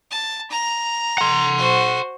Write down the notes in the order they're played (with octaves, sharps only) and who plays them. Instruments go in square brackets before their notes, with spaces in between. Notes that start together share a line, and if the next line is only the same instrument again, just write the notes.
[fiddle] A5
A#5
[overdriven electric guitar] F#5 C6
[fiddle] F#4 C5